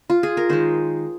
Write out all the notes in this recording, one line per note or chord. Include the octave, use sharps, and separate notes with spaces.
F4
G#4
A#4
D#3 G#3 C5